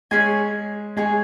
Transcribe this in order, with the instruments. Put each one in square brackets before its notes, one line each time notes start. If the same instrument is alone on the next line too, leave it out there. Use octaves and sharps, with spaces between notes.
[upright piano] G#3 [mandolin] C#4 G#4 C#5 G#5
[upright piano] G#3 [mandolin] G#4 C#5 G#5